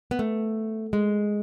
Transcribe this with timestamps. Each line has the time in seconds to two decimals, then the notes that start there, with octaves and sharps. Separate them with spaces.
0.11 B3
0.19 A3
0.93 G#3